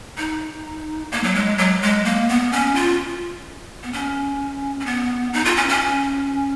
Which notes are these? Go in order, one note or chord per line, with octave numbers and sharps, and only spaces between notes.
D#4
A#3
F#3
G#3
F#3
G#3
A#3
B3
C#4
F4
B3
C#4
C#4
B3
D#4
F4
C#4
C#4